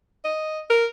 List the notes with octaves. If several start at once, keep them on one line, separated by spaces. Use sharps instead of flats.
D#5
A#4